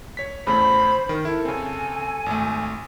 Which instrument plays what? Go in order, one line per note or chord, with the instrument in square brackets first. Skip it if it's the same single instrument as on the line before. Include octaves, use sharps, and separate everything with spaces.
[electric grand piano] C#5 B6
[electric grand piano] E2 C#3 A3 [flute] C5 [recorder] B5
[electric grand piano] D#3 [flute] A#4
[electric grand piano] E4 [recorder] A4
[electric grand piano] C#3 C4 [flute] G#5
[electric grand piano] G#1 A3